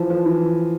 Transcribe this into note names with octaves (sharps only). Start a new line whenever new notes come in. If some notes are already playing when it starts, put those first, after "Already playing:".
Already playing: E3 F3
F3
E3